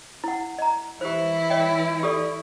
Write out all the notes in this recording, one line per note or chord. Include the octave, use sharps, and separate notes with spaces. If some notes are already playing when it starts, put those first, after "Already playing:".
E4 F#5
D#5 A#5
E3 E4 G4 C5
C#5 D#5 G5
G4 A4 D5